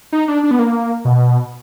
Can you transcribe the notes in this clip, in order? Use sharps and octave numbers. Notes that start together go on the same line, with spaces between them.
D#4
D4
D4
B3
A#3
B2